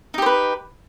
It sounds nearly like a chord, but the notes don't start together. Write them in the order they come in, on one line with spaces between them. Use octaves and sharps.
D#4 G4 C5 B4